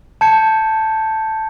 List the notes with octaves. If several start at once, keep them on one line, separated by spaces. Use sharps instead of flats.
A5 G6 G#6 C#7